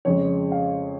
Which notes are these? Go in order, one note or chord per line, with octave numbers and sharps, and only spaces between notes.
F2 C#3 G#3 C#5
F5